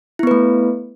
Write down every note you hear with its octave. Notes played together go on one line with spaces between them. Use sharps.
A3 B3 E4 B4